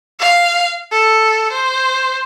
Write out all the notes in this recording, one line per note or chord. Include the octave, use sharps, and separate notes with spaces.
F5
A4
C5